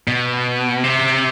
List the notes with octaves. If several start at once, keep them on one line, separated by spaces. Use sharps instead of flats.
B2
C3